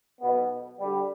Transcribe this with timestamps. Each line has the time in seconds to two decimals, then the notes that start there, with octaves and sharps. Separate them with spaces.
0.21 B1 B2 B3
0.80 D2 D3 G3